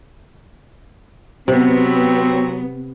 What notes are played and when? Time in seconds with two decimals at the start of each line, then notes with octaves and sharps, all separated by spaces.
1.48 C3 F#3 B3 C4